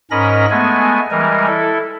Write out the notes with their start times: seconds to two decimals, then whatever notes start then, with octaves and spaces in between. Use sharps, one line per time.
0.11 G#2 C#4 A#4 D#5 B5 A#6
0.50 G#3 A3 B3 G#5
1.11 E3 G3 G#3 A#4
1.47 E4 A4